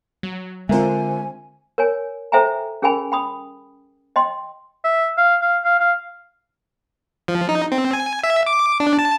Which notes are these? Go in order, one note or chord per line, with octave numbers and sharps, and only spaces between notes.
F#3
D3 G#3 C4 F4 A#4 C5 E5 G#5
A#4 C#5 G#5
A4 C5 E5 G5 G#5 A#5
C#4 G#4 A#4 G5 G#5 B5
G5 B5 D#6
D#5 G5 C6
E5
F5
F5
F5
F5
F3
D#4
C4
G#5
E5
D6
D4
A5